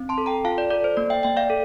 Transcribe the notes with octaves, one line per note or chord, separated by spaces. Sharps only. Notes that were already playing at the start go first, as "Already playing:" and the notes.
Already playing: C4
A5 C6
A4
G5 A#5
F4 F5 A5
D5
A4 D5
C5
A#3 D5
E5 G5
A#3 E5 G5
D5 F5
A4